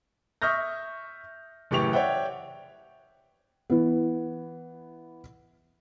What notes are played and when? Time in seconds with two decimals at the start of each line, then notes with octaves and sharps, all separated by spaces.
0.42 E5 C#6 D#6 F6 G6 A#6
1.71 F#1 A2 E3 G4 C#6 F7
1.93 C#5 D5 E5 F#5 G5
3.70 E3 B3